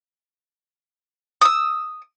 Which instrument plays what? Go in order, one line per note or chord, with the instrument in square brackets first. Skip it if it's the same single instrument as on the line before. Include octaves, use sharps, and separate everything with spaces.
[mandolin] D#6 E6